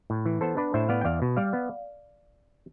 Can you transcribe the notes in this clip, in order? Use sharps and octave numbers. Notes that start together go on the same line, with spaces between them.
A2
E3
B3 A4 C5
D4 B4 D5
A2 C5 E5
B3 D5 F5
G5
E2 D5 F5
B2
G3 D5 F5
B3